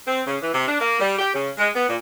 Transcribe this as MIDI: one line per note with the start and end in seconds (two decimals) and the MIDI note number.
0.06 0.20 60
0.26 0.35 49
0.41 0.52 52
0.53 0.63 48
0.66 0.75 62
0.80 0.99 58
0.99 1.15 55
1.18 1.32 67
1.33 1.49 49
1.58 1.67 56
1.73 1.85 59
1.87 1.96 46